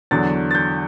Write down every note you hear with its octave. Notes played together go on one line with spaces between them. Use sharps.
E2 D3 F#3 A6
A6
G6